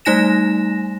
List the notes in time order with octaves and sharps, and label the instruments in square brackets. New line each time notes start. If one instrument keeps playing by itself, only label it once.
[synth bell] G3 A3 D#4 G#5 A#6 E7